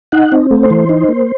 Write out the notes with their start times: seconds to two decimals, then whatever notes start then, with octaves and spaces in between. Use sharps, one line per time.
0.12 D#4 F#5
0.32 C4
0.51 A3
0.63 C5
0.70 E3
0.89 D#4
1.09 A#3